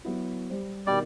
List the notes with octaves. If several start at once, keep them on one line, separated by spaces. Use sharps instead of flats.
F#3 B3 E4
G3 C5
B2 D#3 G3 D5